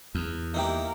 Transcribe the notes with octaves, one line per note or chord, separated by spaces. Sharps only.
E2
A#3 D#4 E4 G4 A#4